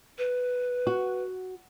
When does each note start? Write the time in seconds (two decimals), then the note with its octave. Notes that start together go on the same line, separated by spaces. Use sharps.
0.18 B4
0.87 F#4